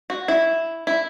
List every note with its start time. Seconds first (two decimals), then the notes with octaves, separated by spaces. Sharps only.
0.10 F#4
0.28 E4
0.87 E4